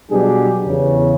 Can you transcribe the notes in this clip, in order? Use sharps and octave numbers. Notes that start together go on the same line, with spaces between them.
B2 F#3 G3 D4 G4 G#4
E2 C#3